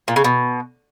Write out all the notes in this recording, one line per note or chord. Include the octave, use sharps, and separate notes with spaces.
A#2
C#3
B2